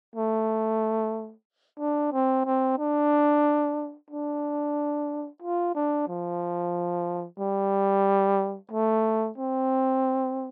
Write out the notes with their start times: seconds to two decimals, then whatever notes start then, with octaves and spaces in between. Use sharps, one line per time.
0.15 A3
1.79 D4
2.12 C4
2.46 C4
2.78 D4
4.10 D4
5.42 F4
5.75 D4
6.08 F3
7.39 G3
8.71 A3
9.38 C4